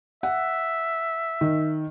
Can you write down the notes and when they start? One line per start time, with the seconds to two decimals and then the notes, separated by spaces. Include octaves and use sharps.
0.23 E5 F#5
1.41 D#3